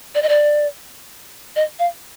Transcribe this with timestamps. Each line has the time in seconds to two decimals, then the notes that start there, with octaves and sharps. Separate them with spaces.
0.15 D5
0.22 D#5
0.29 D5
1.56 D#5
1.79 F5